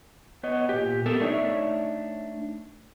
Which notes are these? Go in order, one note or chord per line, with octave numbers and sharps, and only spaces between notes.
B3 B4 C#5 D#5
A#2 G4
B3 A4 A#4
A3 D4 D#4 A#4 C#5 E5